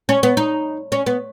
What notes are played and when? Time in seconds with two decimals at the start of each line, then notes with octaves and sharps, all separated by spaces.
0.09 C#4
0.23 B3
0.37 D#4
0.92 C#4
1.07 B3